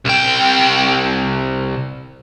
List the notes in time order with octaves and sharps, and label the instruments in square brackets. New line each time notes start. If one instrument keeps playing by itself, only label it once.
[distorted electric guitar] C2 G5